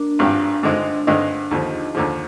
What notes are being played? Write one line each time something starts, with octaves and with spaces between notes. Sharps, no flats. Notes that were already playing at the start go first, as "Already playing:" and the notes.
Already playing: A#3 D4
G#1 G2 F3 C4 G4
G2 D3 G#3 C4 D4 D#4 F4
G2 D3 G#3 C4 D#4
D#2 D3 F3 D#4 G4
F4 G#4
D#2 D3 F3